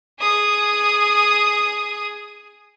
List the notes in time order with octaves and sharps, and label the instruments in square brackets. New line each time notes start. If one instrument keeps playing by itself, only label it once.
[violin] G#4 D#6